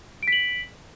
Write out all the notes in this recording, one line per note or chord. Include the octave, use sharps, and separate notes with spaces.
B6 D7 F#7